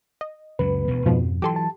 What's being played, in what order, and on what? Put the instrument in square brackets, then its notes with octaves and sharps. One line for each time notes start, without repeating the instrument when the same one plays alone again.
[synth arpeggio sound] D#5
[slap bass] C#2 F#2 F#3 [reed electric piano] B4
[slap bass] E1 D2 B2
[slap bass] F2 [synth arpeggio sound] G#2 B2 F3
[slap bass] E3 F#3 [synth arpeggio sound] G4 A4 C6
[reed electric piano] A5